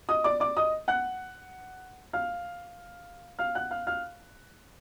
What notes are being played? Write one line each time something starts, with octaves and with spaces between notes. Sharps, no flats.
D#5 D#6
D5 D6
D5 D6
D#5 D#6
F#5 F#6
F5 F6
F5 F6
F#5 F#6
F5 F6
F5 F6